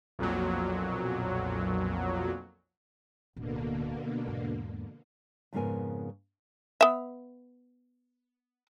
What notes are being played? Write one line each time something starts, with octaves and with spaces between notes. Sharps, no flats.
B1 F2 A#2 F#3
D1 B2 D3 A#3
E2 G#2
F2 G#2 C#3 B3 A#4 G#5
B3 E5